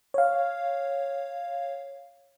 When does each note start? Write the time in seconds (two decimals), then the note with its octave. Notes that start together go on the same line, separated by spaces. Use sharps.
0.14 C#5 F5